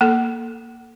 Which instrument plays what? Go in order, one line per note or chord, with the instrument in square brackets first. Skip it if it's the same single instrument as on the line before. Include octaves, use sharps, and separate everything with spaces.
[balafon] A#3 A4